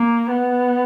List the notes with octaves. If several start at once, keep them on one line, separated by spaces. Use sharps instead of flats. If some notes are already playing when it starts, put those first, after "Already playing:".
Already playing: A#3
B3